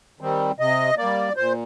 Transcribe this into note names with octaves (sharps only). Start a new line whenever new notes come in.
D#3 G3 C4
C3 D#5
A#3 D5
G3
A#2 C5